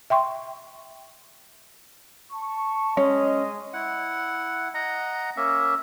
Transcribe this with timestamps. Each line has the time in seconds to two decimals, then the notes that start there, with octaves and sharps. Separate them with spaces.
0.10 E5 G5 C6 C#6
2.32 A5 C#6
2.97 G#3 C#4 D#5
3.74 E4 F#5
4.74 D#5 F#5 A#5
5.37 A#3 C#4 E5